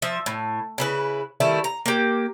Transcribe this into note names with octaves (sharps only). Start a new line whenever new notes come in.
F3 E5
A2
C#3 E4 B4
D#3 G3 A3 E4
A#5
A#3 G4